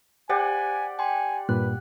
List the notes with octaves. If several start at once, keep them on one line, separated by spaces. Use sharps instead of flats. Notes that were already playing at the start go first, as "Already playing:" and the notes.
G4 C5 D5 F#5 G#5
G5 G#5 C6
G2 A#2 B4 F#6